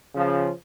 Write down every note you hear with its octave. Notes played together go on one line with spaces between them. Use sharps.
C#3 F3